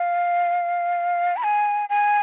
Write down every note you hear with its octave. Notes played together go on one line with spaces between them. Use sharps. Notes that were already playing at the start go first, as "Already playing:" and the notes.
Already playing: F5
B5
G#5
G#5